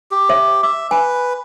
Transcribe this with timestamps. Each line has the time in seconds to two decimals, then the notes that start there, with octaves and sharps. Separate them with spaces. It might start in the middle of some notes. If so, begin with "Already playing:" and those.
0.11 G4
0.29 C5 E5
0.63 E5 D6
0.91 B4 G#5